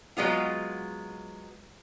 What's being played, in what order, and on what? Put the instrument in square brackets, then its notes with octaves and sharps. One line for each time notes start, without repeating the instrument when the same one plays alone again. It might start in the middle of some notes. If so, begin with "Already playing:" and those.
[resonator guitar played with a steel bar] F#3 G#3 B3 F4